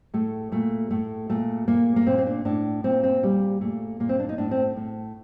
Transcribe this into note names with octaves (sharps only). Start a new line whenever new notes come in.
A2 A3
A#2 A3
A2 A3
A#2 A3
A#2 A#3
A#3
A#2 C4
C4
D4
A2 D4
A#2 C4
C4
A#2 G3
A#2 A3
A#2 A#3
C4
D4
D#4
A2 D4
C4
A2